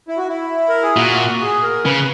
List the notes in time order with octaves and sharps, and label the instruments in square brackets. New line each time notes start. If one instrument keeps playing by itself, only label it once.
[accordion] E4
F#4
E4
A#4
G#4
[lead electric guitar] A#2 [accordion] F#4
[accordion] G#4
A#4
[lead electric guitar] C#3 [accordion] B4